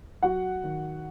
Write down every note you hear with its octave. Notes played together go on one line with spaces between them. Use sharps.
F#3 F#4 F#5
D#3